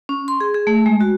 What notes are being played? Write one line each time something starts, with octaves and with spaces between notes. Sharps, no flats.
C#4
C6
G#4
G#4
A3
G#3
F#4